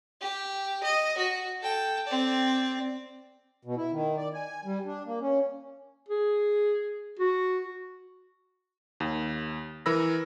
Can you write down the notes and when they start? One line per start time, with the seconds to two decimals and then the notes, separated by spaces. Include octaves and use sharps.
0.21 G4
0.83 D#5
1.17 F#4
1.61 A4 G5
2.07 C4 D5
3.65 B2
3.76 E4
3.92 D#3
4.17 D5
4.34 G#5
4.65 G3
4.85 D4
5.06 A#3
5.21 C#4
6.09 G#4
7.19 F#4
9.00 D#2
9.86 E3 A#4 B5 E6 A#6